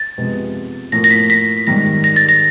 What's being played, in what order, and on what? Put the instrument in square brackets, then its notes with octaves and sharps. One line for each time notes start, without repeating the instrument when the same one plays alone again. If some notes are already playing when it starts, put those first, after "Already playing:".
Already playing: [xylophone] A6
[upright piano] C3 F3 G#3 B3
[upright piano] A2 F3 A#3 [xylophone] A#6
[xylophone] A#6
B6
B6
[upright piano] G#2 D#3 G3 [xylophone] A#6
[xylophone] A#6
A6
A#6